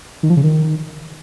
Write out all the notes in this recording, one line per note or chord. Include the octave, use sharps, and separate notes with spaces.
D#3
F3
C#3
D#3